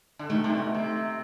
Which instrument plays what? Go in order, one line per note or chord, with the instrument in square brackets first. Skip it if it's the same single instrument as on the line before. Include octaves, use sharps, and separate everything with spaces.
[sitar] D3
[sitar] D#3 [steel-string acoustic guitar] A3
[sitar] C3
B2
C3